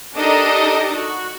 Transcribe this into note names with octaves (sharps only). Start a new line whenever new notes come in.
D4 D#4 G4 A4 A#4 D#5
F#4